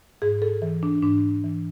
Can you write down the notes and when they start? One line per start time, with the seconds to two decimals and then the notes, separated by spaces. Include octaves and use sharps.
0.22 G#2 G#4
0.42 A4
0.62 E3
0.83 D4
1.03 G#2 D4
1.44 E3